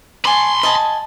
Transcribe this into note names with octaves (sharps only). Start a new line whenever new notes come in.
D5 G#5 A5 B5 C6
D#5 G#5 A5